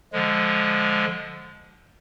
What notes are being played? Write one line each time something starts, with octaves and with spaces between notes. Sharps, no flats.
D3 F3 G#3